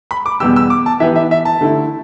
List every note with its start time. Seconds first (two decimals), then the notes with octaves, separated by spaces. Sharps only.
0.11 B5
0.26 D6
0.40 E2 B2 G3 B3 G4 E6
0.56 E6
0.70 D6
0.86 A5
1.00 E3 B3 G4 B4 E5
1.16 E5
1.31 E5
1.45 A5
1.61 D3 A3 E4